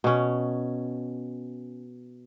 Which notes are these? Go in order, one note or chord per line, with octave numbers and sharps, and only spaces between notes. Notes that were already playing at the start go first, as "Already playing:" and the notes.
B2 C#4